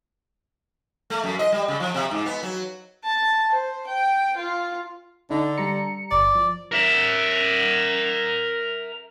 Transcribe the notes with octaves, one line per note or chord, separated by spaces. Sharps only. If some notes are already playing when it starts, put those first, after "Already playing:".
A3
F#2
D#5
G3
C#3
F3
C3
G#2
B3
F#3
A5
C5
G5
F4
D3 D#4
G3 A#5 C#7
G1 D5
F3
A#4 E5